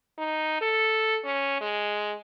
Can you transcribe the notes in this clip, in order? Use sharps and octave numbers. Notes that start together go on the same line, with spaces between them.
D#4
A4
C#4
G#3